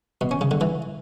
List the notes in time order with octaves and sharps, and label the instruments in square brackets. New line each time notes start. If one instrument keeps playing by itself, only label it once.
[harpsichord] B2
C#4
C#3
D3
E3